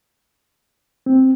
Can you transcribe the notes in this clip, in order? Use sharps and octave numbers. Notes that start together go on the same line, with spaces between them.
C4